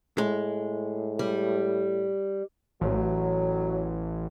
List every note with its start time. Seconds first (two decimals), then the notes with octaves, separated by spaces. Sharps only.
0.18 A2 G#3
1.19 G3
2.81 A1 F#3